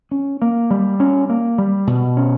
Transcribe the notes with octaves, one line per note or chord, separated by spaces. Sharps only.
C#4
A#3
G3
C#4
A#3
G3
B2
C#4